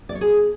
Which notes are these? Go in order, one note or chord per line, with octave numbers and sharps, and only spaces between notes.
D5
C#5
G#4